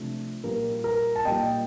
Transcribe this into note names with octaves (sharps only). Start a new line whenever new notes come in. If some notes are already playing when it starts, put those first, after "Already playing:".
Already playing: C3 F3 A3 D4
A#2 G3 A#3 A#4
A#4
A5
A#2 G3 A#3 D#5 G5